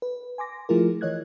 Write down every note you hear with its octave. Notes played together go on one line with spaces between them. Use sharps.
B4
G#5 C6 D6 A#6
F3 A3 E4 F4 G#4 A#4
E3 C#5 D#5 F#6 G#6